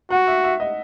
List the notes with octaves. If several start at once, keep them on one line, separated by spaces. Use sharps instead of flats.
F#4 F#5
E5
E5
D#5